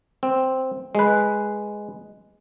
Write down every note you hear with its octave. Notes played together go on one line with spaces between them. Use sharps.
C4
G#3 B4